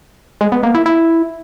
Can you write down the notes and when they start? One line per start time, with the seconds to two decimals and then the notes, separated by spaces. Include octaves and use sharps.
0.41 G#3
0.52 B3
0.63 A#3
0.75 E4
0.86 E4